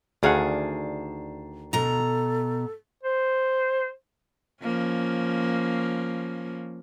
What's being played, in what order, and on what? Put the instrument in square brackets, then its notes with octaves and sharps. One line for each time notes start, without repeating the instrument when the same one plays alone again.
[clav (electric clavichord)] D2 F5 F#5 [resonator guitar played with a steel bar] D#3 D4 G#4
[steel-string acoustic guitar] B2 A#5 [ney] A4
[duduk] C5
[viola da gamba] F3 A#3 C#4